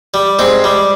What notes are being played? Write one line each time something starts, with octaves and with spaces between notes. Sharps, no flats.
G3
G#2 C4
G3